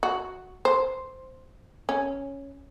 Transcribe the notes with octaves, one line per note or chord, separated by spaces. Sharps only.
F#4
C5
C#4